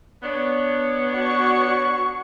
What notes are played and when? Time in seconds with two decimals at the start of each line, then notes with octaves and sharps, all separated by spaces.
0.23 B3 D4 C#5
1.13 F#4 C#6